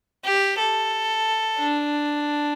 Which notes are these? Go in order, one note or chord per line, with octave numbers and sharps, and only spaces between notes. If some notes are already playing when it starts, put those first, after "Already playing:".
G4
A4
D4